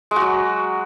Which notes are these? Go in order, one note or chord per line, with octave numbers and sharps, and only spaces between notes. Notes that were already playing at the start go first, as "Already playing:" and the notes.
F#3 G#3 F#4